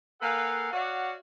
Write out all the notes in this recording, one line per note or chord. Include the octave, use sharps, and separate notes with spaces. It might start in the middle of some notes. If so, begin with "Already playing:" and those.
A#3 A4 B4 F5 F#5 G#5
F#4 C#5 D5 F5 F#5